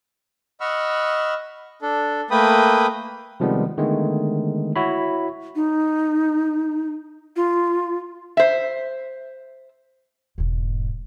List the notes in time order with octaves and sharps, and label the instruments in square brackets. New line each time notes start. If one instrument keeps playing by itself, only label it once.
[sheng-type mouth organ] D#5 F#5 B5 C#6 E6 F6
D4 A4
A3 A#3 B4 G5 B5 D#6
[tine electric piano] C3 D#3 F3 G3 G#3 B3
D3 D#3 G#3 A3 B3
E4 F#4 C#5 B5
[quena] D#4
F4
[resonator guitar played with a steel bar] C5 E5
[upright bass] E1 G#2